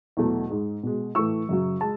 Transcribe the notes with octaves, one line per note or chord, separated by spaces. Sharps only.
E2 B2 F#3 A3
G#2 G#3
B2 G#3
A2 E3 A3 C#6 E6
F#2 C#3 F#3
G#3 A5